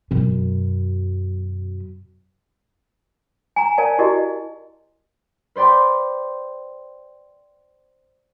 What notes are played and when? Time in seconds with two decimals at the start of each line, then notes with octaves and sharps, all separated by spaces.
0.11 F#2 B2
3.56 G#5 A#5
3.78 A#4 C#5 D5 F5 G#5 A5
3.99 E4 F#4 G4 A#4 D5 D#5
5.55 B4 C5 D5 G5 C6